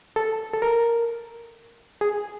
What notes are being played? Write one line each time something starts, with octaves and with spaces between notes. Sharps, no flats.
A4
A4
A#4
G#4